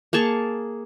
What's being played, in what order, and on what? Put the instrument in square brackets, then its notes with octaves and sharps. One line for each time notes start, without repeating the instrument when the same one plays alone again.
[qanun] A#3 G#4 A5 C#6